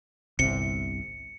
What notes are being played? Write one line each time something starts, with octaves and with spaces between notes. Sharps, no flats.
G1 C2 C3 C#7